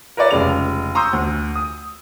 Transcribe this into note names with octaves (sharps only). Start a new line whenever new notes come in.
A#4 B4 C#5 D5 E5
F1 C#3 G#3 F7
A#5 C6 C#6 D#6 E6 G6
D2
D#6